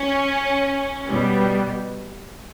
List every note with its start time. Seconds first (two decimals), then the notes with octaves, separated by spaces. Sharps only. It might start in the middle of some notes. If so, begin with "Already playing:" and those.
Already playing: C#4
1.08 B2 G3 B3